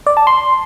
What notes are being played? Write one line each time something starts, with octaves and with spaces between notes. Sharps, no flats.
D5
A5
C6